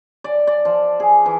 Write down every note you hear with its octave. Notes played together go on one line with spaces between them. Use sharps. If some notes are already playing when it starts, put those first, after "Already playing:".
D5
D5
F3
G#4
E3